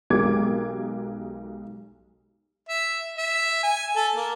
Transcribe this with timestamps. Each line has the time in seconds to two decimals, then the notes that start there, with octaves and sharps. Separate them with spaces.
0.10 B1 G#3 G4 A#4 D6 G#6
2.69 E5
3.18 E5
3.63 G#5
3.96 A4
4.16 A#3